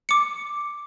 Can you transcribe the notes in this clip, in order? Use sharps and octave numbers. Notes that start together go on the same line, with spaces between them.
D6 C#7